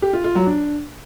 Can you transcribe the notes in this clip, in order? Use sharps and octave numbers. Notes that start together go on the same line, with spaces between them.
G4
F4
F4
F#3
D4